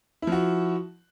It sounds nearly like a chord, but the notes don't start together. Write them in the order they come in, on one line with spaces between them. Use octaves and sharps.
E4 F3 F#4